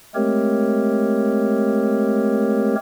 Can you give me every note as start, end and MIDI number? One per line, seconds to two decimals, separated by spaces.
0.15 2.75 56
0.15 2.75 57
0.15 2.75 60
0.15 2.75 67
0.15 2.75 70
0.15 2.75 73